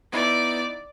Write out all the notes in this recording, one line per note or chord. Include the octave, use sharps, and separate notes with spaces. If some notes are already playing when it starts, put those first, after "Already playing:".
B3 D#4 E4 D5